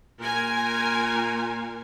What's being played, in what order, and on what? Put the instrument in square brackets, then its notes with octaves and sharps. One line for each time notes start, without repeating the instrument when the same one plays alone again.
[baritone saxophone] A#2 [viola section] A#4 G#5